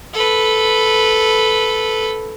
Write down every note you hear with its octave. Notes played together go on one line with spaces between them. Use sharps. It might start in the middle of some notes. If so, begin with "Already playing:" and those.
A4 B4